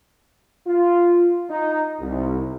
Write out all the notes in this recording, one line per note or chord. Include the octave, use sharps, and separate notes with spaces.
F4
D#4
C2